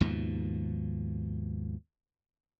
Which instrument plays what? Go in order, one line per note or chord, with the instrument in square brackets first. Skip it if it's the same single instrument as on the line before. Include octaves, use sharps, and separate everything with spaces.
[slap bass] D#2 G#2 B2 F3